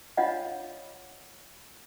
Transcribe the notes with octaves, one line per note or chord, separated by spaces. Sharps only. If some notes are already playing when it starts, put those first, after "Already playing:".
D4 F4 C#5 D#5 F5 F#5